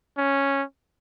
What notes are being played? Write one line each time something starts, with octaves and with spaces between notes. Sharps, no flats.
C#4